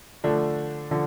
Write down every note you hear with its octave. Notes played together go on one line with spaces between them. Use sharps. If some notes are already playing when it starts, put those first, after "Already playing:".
D3 F3 A3 D4
D3 F3